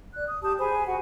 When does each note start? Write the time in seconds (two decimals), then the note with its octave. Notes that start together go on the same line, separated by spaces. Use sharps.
0.15 D5 F#6
0.28 D#6
0.43 G4 A5 D#6 G6
0.59 G#4 C5 G#5 B5
0.85 F#4 F#5